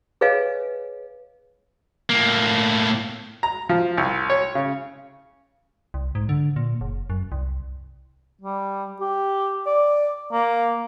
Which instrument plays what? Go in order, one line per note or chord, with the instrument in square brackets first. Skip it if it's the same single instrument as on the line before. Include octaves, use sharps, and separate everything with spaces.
[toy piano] G#4 B4 C#5 D#5 F5 G#5
[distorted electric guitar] A2 A#3
[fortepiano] A#5
F3
C2
C#5
C#3
[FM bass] C2
G#2
D3
A#2
F#1
F#2
C2
[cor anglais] G3
G4
D5
A#3